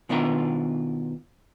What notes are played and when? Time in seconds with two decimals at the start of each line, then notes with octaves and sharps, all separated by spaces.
0.09 B2 D#3 B3 D4 F4 A#4